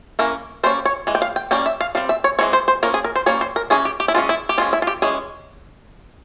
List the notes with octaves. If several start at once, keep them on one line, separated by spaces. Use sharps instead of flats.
E3 A#3 C#4 A#4
G3 A#3 C#4 C5
C#5
E3 G#3
G5
F5
G5
G3 A#3 C#4 G5
E5
F5
G3 C4 F5
E5
C#5
E3 G#3 C4 C#5
C5
C5
F3 A#3 C#4 A#4
G#4
A#4
C5
G3 A#3 C#4 C#5
C5
A#4
E3 A#3 C#4 G#4
G4
G4
E4
E3 G#3 C#4 F4
E4
G4
F3 G#3 C#4 F4
E4
F4
G4
E3 G#3 C#4 G#4